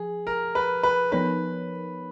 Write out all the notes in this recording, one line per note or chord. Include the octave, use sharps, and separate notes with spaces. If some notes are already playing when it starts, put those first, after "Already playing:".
Already playing: F3 G#4
A#4
B4
B4
F3 B3 D#4 A#4 B4 C#5